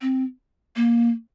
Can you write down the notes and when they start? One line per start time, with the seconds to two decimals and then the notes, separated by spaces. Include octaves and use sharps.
0.02 C4
0.76 A#3